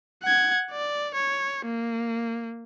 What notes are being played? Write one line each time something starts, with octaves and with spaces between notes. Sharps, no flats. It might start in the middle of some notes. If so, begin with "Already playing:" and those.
F#5 G#6
D5
C#5
A#3